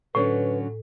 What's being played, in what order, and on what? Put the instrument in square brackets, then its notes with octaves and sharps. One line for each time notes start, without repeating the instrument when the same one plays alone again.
[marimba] A2 [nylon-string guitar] D3 F#3 C#4 [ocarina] B4